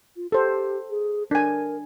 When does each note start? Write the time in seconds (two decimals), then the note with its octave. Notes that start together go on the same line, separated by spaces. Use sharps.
0.16 F4
0.32 G4 A4 C5
0.90 G#4
1.31 D4 A#4 G#5